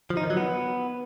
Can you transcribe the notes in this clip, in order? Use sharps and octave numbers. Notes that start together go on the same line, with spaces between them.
F3
D#4
D#3
F#3
B3